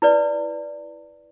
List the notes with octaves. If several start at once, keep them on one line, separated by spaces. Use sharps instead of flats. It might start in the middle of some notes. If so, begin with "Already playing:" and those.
E4 B4 D5